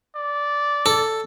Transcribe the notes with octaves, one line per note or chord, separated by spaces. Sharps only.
D5
A4